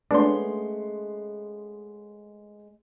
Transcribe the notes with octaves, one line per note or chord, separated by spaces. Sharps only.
G#3 A3 B3 C#4 D4 C6